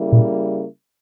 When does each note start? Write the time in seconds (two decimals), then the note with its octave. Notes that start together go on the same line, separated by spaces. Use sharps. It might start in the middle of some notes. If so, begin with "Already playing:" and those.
Already playing: C#3 G3 A#3 E4
0.12 A#2